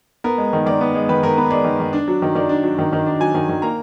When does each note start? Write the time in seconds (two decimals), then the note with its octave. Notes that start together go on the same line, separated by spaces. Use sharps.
0.24 B3 A#4
0.38 G#3
0.53 D#3
0.66 D#3 D5
0.81 B3
0.95 G#3
1.09 D#3 B4
1.23 D#3 A#4
1.38 B3 B4
1.51 G#3 D5
1.65 D#3
1.80 D#3
1.93 D4
2.08 F#3
2.22 D#3
2.35 D#3 D5
2.49 D4
2.64 F#3
2.79 D#3
2.93 D#3
3.06 D4
3.20 F#3 G#5
3.35 D#3
3.49 D#3
3.62 A#3 A#5